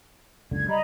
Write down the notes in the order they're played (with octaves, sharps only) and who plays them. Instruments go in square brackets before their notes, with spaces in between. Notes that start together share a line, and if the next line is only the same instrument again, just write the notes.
[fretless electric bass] F#1 C#2 D3 [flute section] G#6
[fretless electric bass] G3 [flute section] D#5 A#5 B5